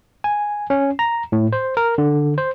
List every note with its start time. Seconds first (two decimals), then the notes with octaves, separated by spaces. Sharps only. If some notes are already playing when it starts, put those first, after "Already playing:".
0.24 G#5
0.70 C#4
0.99 A#5
1.32 A2
1.53 C5
1.77 A#4
1.98 D3
2.38 C5